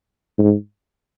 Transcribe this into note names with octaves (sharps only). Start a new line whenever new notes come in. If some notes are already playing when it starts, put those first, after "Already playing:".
G#2